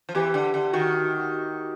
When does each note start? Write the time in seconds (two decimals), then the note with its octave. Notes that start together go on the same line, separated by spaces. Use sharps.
0.09 F3
0.15 E2 E3 G4
0.34 D3
0.54 D3
0.73 D#3 F#4